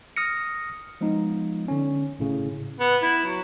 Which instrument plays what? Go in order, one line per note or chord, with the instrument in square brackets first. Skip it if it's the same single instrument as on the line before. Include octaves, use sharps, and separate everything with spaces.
[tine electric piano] D#6 F6 A#6 C#7
F3 G#3 B3 D#4
D3 C#4
G#1 A2 C#3
[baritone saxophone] B3
E4
F#3